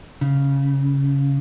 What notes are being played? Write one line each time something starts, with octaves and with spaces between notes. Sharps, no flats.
C#3